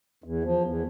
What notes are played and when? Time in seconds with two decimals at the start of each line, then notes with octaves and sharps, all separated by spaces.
0.24 E2
0.44 F3
0.63 E2